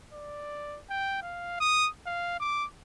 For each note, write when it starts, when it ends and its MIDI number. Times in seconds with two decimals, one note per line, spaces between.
0.13 0.79 74
0.90 1.22 79
1.22 1.56 77
1.60 1.88 87
2.06 2.36 77
2.40 2.65 86